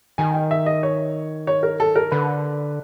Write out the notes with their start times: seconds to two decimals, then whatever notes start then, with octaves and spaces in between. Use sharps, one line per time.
0.18 D#3 G#5
0.34 G5
0.51 E5
0.66 D#5
0.83 C#5
1.47 C#5
1.63 A#4
1.80 A4
1.96 A#4
2.12 D3 B4